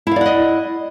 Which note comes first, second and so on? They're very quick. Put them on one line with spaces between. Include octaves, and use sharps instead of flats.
E4 F5 D5 F#5 D#5